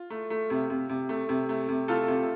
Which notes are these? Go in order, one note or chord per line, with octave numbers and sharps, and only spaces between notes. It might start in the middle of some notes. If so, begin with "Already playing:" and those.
Already playing: F4
A3
A3
C3
C3
C3
A3
C3
A3
C3
A3 F4 A4
C3